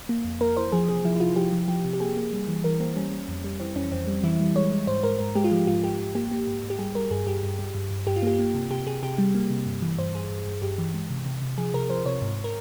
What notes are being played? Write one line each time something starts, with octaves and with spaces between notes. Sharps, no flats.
A#3
F2
A#3 A#4
E3 C5
F3 G#4
C3 G#4
F3 E4
E4
C3 F4
F3 G4
F3
F3 G4
C3
G4
A#3 G#4
A#3
G3
E3
E3 A#4
A#3 C4
G3 C#4
G3
F2
G3
E3 C4
F2 C#4
F2 C4
G3
E3 E4
G3
G#3 C#5
G#3
G#2 C5
G#2 A#4
G#2 A#4
G#3 G4
F4
F3 G4
G#2 F4
G#2 G4
G#2
A#3 G4
A#3
G#2
G#2
G4
G3 G#4
G3 A#4
G2 G#4
G2 G4
G2
G3
G2
G2
G2 G4
F4
A#3 G4
A#3
C3
C3 G4
C3 G#4
C3 G4
G3
A#3
C3
G2
E3
G2 C5
G2 G#4
G2
G2
G2 G4
E3
G#3
C3
C3
C3
F3 G#4
C3 A#4
F3 C5
C3 C#5
G#2
A#4